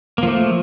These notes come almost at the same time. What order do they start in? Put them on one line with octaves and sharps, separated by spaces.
A#3 F3 A3